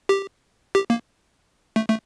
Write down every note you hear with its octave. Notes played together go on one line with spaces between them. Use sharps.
G4
G4
A#3
A3
A3